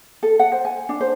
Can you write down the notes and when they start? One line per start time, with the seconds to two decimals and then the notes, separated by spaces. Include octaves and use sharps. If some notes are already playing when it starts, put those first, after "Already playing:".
0.23 A4
0.39 F#5
0.52 C5
0.65 G#5
0.89 D4
1.01 C5